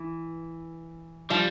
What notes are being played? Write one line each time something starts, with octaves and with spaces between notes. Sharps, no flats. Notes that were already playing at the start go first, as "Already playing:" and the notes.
Already playing: E3
F3 G3